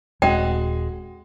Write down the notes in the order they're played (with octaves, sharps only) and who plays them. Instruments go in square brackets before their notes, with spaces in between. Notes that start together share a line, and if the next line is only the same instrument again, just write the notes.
[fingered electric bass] D#1 C4 C#4 [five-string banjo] G#3 F#4 [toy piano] G5